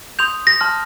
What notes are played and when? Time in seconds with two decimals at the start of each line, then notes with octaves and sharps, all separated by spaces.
0.19 C6 D#6 G6 F7
0.47 A#6
0.61 A5 C6 F6